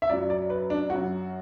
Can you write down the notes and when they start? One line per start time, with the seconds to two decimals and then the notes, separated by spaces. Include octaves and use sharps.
0.02 E5
0.09 F#2 F#3 D5
0.30 D5
0.50 B4
0.70 D4
0.90 F#2 F#3 F#4